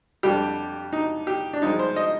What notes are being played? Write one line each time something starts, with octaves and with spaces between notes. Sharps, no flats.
F2 D3 G3 G4
D#4
G4
D4
G2 F3 G#3 D#4
C5
D#5